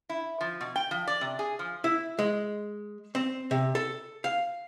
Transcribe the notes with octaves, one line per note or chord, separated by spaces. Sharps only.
E4
F3
B2
G5
F3
D5
C3
G#4
F3
E4
G#3
C4
C3
A4
F5